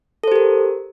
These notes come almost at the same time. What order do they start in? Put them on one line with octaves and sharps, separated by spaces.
A4 C5 G4 A#4